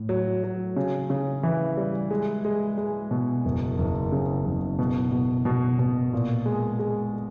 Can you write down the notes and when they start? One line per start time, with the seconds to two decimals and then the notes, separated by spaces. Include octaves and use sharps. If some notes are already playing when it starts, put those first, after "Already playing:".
Already playing: A2
0.09 F#3
0.43 F#3
0.77 C#3
1.10 C#3
1.43 E3
1.77 G3
2.10 G#3
2.45 G#3
2.78 G#3
3.11 B2
3.45 F#1
3.78 F#1
4.12 C#3
4.45 F#1
4.79 B2
5.12 B2
5.45 B2
5.79 B2
6.13 A#2
6.46 G#3
6.79 G#3